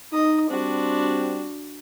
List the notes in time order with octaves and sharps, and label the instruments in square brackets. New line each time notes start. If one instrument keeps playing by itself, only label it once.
[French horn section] D#4 [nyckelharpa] D#5 D#6
[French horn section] G3 C4 [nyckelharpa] D4 F#4